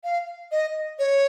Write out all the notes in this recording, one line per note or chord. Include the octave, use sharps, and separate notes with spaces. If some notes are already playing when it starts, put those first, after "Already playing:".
F5
D#5
C#5